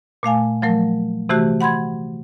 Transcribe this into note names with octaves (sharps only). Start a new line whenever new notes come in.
A#2 A3 F5 G#5
F3 F#3 A3 A#4
C3 E3 A3 F#4 G4
F#5 B5 C6 G#6